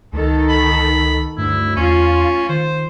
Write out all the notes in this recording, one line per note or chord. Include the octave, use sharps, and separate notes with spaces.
C#2 D#3 A4
B5
D2 G2 E4
E2 C#4 F4
D#3 C5